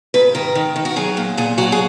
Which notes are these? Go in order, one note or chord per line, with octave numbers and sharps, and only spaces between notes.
G#2 B4
D#3 A#4
D#3
D#3
F#4
F#3 G#4
A#2
A#2 G#4
F#3 F#4
G#4